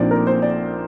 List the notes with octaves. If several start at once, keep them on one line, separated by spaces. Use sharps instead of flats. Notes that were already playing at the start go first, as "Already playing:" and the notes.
Already playing: A#1 A#2 F3 C4 D#4 D5
A#4
C5
D5